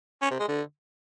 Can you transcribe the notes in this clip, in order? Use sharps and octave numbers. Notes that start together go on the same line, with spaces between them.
C#4
C3
G#3
D3